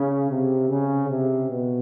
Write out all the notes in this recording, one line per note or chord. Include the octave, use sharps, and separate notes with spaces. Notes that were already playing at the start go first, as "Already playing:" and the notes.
Already playing: C#3
C3
C#3
C3
B2